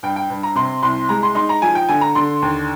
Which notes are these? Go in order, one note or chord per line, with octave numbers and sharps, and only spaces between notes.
G2 G5
G5
G2
A#5
C3 C6
C2 C6
G#3 A#5
C6
D#4 C6
A#5
F3 G#5
G5
D3 G#5
A#5
D3 C6
D#2